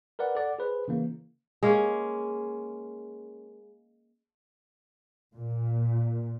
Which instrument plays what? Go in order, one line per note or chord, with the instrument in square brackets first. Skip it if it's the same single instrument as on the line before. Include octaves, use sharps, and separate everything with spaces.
[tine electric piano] A#4 B4 D5 F#5
A4 D5 F#5
G#4 B4 C5
C#3 E3 A#3
[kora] G#3 A#3 C#4
[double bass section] A#2